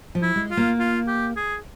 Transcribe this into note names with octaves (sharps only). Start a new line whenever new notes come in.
F3
E4
G#3
F4
A#3
F4
G4
G#4